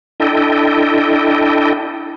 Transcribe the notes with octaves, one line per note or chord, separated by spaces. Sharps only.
D4 E4 A4 D#5 G5